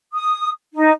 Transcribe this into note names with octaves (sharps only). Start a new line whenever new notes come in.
D#6
D#4